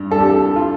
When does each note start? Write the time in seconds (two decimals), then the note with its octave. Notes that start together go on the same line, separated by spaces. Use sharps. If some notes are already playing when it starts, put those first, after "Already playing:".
Already playing: G2
0.11 G2 A4
0.20 G4
0.30 A4
0.56 F4